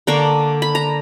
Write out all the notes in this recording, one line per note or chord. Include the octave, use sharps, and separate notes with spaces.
D3 A#3 D4 C#6
B5
A#5